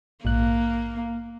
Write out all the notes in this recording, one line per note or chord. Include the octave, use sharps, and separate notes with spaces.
A#1 G#2 A#3 F#6